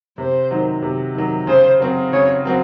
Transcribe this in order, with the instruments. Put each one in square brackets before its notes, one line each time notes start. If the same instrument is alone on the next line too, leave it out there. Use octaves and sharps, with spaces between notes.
[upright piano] C3 [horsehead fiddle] C5
[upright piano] D#3 F#3
C3
D#3 F#3
[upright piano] C#3 [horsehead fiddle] C5
[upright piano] F#3 C4 F#4
[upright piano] C#3 [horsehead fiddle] C#5
[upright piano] F#3 C4 F#4